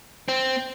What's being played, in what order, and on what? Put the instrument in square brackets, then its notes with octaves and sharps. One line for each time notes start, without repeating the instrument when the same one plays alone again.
[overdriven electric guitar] C4